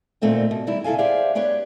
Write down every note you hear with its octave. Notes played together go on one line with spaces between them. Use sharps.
A#2 D3 A3 A#3 C4 D#4
B2
D#3 G3 E4
C#3 E4 A4 F5 G#5
G4 G#4 C5 D5 E5 F5
B3 D4 G4 B4 C#5